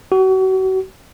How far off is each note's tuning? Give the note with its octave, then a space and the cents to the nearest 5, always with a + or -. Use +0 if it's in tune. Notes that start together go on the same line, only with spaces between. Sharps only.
F#4 +35